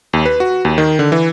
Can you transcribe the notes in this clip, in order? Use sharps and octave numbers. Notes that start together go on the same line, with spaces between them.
D#2
B4
F#4
D#2
D#3
D3
E3